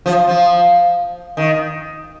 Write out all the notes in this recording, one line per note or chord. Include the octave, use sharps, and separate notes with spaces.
F3
F3
D#3